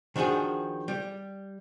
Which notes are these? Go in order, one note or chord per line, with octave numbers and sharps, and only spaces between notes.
D#3 F3 D4 F#4 G#4
G3